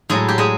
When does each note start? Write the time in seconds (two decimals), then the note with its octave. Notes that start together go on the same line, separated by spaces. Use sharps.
0.10 A2 F#3 G#3 G#4
0.28 G4
0.38 G#3 G#4